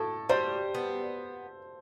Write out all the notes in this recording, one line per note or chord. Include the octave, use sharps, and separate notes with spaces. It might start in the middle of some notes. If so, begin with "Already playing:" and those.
Already playing: A2 A4
G3 C5
B3